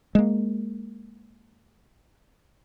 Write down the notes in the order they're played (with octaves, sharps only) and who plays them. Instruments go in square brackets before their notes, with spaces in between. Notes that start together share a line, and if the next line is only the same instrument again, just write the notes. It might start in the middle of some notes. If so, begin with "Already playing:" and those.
[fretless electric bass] G#3 A#3